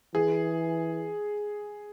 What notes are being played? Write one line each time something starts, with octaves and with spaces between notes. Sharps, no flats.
E3 G#4